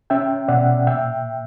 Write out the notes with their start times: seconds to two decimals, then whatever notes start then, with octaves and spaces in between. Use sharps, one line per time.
0.10 C#4 E5 G5
0.48 B2 D5 F#5
0.87 A#2 E5 G5